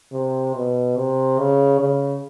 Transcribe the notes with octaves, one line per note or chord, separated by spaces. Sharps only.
C3
B2
C3
C#3
C#3